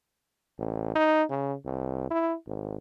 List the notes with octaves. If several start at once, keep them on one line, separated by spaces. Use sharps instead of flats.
A1
D#4
C#3
C2
E4
G#1